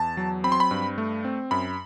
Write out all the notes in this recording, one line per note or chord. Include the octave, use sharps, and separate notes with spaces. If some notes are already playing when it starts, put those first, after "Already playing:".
Already playing: E2 A5
F#3
C4 B5
C6
B5
G2
A3
C4
F#2 B5